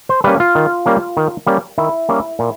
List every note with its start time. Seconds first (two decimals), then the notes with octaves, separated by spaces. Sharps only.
0.09 C5
0.24 G3 A#3 C#4 B4
0.40 F4
0.55 D#3
0.86 G3 A#3 C#4
1.17 D#3
1.47 G3 A#3 C#4
1.78 D#3 E4
2.09 G3 A#3 C#4
2.39 A#2